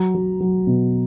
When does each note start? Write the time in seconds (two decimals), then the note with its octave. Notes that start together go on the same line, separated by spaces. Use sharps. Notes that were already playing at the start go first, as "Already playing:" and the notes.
Already playing: F#3 A#5
0.15 F#3
0.40 F#3
0.67 B2